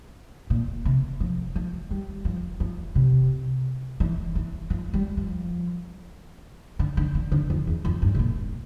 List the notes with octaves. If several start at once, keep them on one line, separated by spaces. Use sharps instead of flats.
A#2
C3
F3
F3
G3
F3
F3
C3
E3
E3
F3
G3
F3
D3
D3
D3
D3
F2
E2
F2
G2
C3
A#2